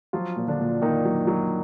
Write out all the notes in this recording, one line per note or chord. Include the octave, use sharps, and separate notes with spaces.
F3 F#3 F4
A#2
D3 D4
A#2
A#2 D#3 D#4
F#3
F#3